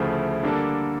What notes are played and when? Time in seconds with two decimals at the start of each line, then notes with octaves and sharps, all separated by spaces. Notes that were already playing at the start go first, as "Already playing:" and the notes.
Already playing: D2 C#3 F3 A3 E4
0.43 D3 G3 A#3 D4 A4